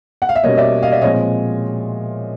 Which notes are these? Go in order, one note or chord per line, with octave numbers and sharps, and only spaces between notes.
F#5
F5
E5
B2 G3 A#3 C#4 C#5 D#5
D5 E5
D#5 F5
D5 E5
A#2 F3 G#3 C4 C#5 D#5